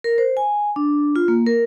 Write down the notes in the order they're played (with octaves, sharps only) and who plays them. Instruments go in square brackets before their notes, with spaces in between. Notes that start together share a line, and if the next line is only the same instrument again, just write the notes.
[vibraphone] A#4
C5
G#5
D4
F4
A#3
A#4